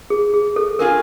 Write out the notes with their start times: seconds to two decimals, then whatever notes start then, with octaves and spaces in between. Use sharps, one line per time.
0.10 G#4
0.34 G#4
0.56 A4
0.79 G#3 C#4 F4 G#4 A#4